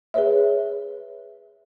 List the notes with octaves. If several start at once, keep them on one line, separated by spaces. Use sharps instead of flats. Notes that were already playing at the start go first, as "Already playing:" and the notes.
G#4 B4 C#5 E5